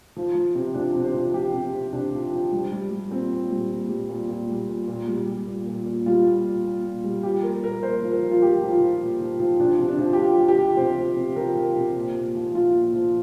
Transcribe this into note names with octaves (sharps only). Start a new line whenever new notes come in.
F3
F3
C3
F3 D4
C3
C5
F3
F3 G4
C3
C3
C3 D4
F3
F3
G3
G3
G3
A#2 C4
A#2
G3
A#2
G3
A#2
A#2
G3
A#2
A#2
G3
G3
A#2
A#2
A#2
G3 F4
A#2
A#2
A#2
A#2
G3
F3 G4
A#2 A#4
A#2 A#4
A#2 C5
F3
A#4
F3
F4
F3 G4
F3
F4
F3
A#2
F3
F3
F3 D4
C3
D4
F3
G4
F3 F4
F3
G4
F3
C3 C5
F3
C3
F3 A#4
F3
C3
A#2
A#2
F3
F3 F4
A#2
F3